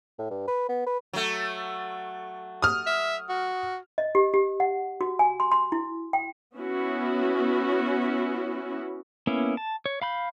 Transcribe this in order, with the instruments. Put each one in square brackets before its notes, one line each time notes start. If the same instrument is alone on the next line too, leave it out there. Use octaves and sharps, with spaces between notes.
[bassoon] A2
G2
B4
B3
B4
[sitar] F#3 A3
[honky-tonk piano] D#6 F6
[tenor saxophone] E5
F#4
[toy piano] D#5
G4
G4
F#5
F#4
G#5
C6
C6
E4
G5
[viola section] B3 C#4 E4 F#4
[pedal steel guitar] A#3 B3 C#4 E4
A5
C#5
F5 B5 G6